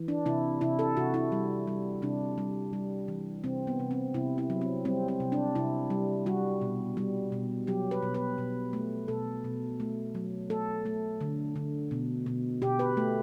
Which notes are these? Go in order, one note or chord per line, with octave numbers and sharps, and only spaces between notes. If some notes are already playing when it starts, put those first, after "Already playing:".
Already playing: E3
D4
C3 E4
C3 E4
A4
C3 F#4
E4
G3
G3
C3 D4
G3
G3
E3
C3 C4
B3
C3
C4
C3 E4
E4
F#3
C4
G3 C4
C4
C3
D4
C3 E4
G3
G3 F#4
B2
G3
B2
F#3 G4
B4
B2
B4
B2
A3
B2 A4
B2
A3
F#3
A3 A4
A3
D3
D3
B2
B2
B2 G4
B4
A3